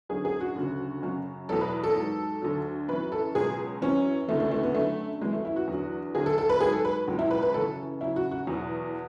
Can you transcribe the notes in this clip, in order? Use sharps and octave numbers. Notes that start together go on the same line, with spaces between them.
F#2 D3 F#3 G#4
G#4
F#4
D2 C#3 F#3
F#2 C#3 F#3
E2 B2 F#3 A4
B4
A4
G#2 F#3
D2 D3 F#3
F#2 E3 B4
A4
C#2 B2 F#3 G#4
F#2 E3 C#4
D2 C#3 E3 A3
A3
A3
B3
F#2 D3 F#3 A3
F#2 E3 G#3
A3
E4
F#4
E2 D3 F#3
D2 D3 F#3 G#4
A4
A4
B4
G#2 F#3 G#4
A4
B4
C#2 B2 F#3
E4
B4
B4
F#2 C#3 E3 A4
F#2 C#3 F#3 E4
F#4
F#4
E2 B2 F#3